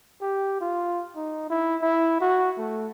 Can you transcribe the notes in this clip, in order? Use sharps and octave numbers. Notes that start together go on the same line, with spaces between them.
G4
F4
D#4
E4
E4
F#4
A3